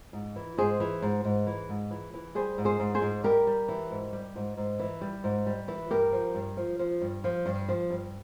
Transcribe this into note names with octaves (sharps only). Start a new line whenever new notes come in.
G#2
E3
G#2 G#4 C5
E3
G#2
G#2
E3
G#2
E3
E3
G3 G#4 C5
G#2
G#4 C5
G#2
G#4 C5
G#2
G3 G4 A#4
G3
E3
G#2
G3
G#2
G#2
E3
G3
G#2
G3
E3
G2 G4 A#4
F3
G2
F3
F3
G2
F3
G2
F3
G2